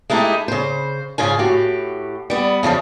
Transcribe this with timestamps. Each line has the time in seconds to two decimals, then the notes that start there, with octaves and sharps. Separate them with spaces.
0.10 G#3 A3 D#4 E4 G4
0.48 C#3 C5
1.18 G#2 C#3 F4 G#5
1.39 A2 F#4 G4
2.30 G3 B3
2.63 F2 C#3 E3 F3